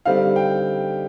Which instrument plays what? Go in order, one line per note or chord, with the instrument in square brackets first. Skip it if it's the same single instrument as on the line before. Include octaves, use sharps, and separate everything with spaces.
[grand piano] D3 G3 C4 D#4 F5
G5